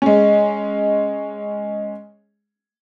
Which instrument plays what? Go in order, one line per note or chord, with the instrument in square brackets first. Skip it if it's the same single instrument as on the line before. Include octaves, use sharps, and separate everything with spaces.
[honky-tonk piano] G#3 C#4